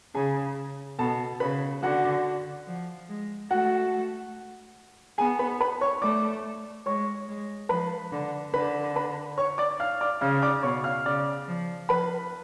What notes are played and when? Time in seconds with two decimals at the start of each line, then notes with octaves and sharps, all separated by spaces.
0.15 C#3 G#4 G#5
0.99 B2 A4 A5
1.40 C#3 B4 B5
1.83 D3 F#4 F#5
2.67 F3
3.09 G#3
3.50 A3 F#4 F#5
5.18 B3 G#4 G#5
5.39 B4 B5
5.61 B4 B5
5.81 C#5 C#6
6.02 A3 D5 D6
6.86 G#3 C#5 C#6
7.28 G#3
7.69 F3 B4 B5
8.12 D3
8.54 D3 B4 B5
8.96 B4 B5
9.38 C#5 C#6
9.58 D5 D6
9.80 F5 F6
10.01 D5 D6
10.21 C#3 F5 F6
10.42 D5 D6
10.63 B2 C#5 C#6
10.84 F5 F6
11.05 C#3 D5 D6
11.47 F3
11.89 F3 B4 B5